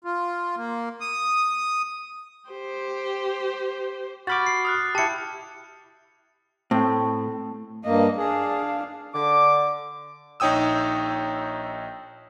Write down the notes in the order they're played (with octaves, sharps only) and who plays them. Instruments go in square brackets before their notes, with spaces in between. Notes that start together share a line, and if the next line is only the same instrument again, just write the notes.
[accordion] F4
A#3
D#6
[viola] G4 C5
[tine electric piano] F#4 B5 D6 [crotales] F6 G6 A6
[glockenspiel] C7
[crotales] D#6 F6 F#6
[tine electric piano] E4 G4 [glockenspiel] A5 C#7
[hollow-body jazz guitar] A2 [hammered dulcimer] A3 [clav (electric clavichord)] C4
[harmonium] G2 A#3 [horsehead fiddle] D#5
[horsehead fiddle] D4 F5 [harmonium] G#4
[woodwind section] D3 D6
[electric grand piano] A#1 D#4 C#5 G5 D#6 E6